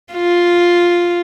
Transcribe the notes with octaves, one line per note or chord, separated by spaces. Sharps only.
F4